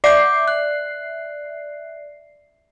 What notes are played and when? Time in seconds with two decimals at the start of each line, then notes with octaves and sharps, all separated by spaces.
0.04 D5 E5 D6 G6 C7
0.48 F#6